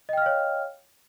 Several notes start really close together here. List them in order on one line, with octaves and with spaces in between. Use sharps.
D#5 G5 F6 F5 C#5